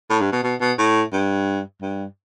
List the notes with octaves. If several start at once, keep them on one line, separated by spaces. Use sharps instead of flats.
A2
G2
B2
B2
B2
A2
G2
G2